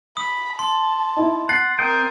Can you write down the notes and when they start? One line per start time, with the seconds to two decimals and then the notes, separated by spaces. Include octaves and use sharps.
0.17 B5 D#6
0.59 A5 C6
1.17 D#4 E4
1.49 F#5 A6 C7
1.79 C4 A#4 D#5 G5